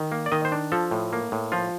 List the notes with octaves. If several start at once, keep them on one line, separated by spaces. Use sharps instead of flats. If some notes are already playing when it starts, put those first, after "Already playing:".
Already playing: D#3
A#3
D5
D#3 D#5
C5
D4
F3 A4
A2
A#3
A2
F3 F4